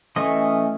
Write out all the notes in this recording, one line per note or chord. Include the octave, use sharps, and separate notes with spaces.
E3 A3 C#4 D#5